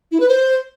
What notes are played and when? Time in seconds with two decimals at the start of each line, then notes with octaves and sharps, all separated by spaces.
0.12 E4
0.20 B4
0.29 C5